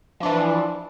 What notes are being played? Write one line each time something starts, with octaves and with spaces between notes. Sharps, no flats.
E3 F3 D4